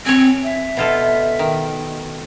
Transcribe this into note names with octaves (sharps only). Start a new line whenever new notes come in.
C4 C#5 G#5
E5
B2 F4 A4
D#3